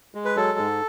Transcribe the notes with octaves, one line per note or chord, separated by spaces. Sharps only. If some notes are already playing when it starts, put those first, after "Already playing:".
G#3
B4
F#3 A4
G#2